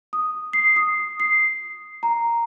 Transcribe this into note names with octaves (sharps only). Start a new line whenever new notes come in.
D#6
C7
D#6
C7
A#5